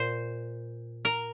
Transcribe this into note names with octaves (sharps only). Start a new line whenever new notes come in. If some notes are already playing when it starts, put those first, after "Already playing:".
Already playing: A#2 C5
A#4